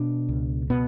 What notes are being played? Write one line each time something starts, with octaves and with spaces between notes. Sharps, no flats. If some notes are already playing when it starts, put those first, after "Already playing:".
Already playing: B2 D4
C#2
B2 B3